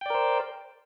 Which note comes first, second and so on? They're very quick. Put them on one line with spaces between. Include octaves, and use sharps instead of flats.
G5 D5 A#4 C5